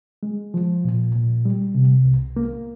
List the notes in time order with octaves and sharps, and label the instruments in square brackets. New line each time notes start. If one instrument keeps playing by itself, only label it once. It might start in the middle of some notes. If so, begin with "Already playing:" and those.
[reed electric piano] G#3
F3
A#2
A#2
G3
C3
C2
A#3